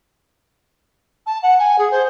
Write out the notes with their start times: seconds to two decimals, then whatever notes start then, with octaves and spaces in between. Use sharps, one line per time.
1.26 A5
1.42 F#5
1.59 G#5
1.78 G#4
1.91 C5